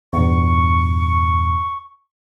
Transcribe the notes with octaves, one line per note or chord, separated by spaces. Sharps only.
E2 G2 A#2 C#6